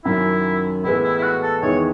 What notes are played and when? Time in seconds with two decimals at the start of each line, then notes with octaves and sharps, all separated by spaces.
0.05 F#2 D#3 F#3 C#4 E4
0.84 A2 E3 G#3 B3 E4
1.04 E4
1.18 E4
1.23 F#4
1.42 A4
1.62 E2 D#3 G#3 B3 E4 C#5